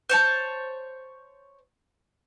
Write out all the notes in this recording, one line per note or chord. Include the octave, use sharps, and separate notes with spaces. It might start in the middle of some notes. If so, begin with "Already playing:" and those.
C5 C#5 A5